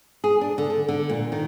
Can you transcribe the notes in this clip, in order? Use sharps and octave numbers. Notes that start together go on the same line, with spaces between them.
G#4
D4
D3
D3
D3
A#2
D#3